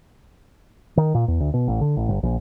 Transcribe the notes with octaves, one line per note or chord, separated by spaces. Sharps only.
D#3
A#2
E2
D2
B2
A1
D3
A1
G1
A#1